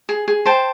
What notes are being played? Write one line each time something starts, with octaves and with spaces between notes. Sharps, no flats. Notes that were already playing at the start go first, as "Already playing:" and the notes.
G#4
G#4
C5 G5 A5